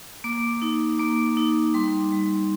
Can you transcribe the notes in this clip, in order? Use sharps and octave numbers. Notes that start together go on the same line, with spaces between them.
A#3 D6
D#4
A#3 D6
D#4
G3 C6
G3